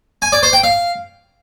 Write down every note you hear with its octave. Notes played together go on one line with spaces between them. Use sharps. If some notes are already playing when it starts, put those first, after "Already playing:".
G#5
D5
C5
G5
F5